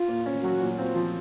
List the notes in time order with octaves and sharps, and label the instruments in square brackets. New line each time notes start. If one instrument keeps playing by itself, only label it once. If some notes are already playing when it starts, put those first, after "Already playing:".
Already playing: [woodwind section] F4
[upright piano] A#2
C#4
[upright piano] F#3 [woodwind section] F#4
[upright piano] A#2
[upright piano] C4 [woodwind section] F4
[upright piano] F3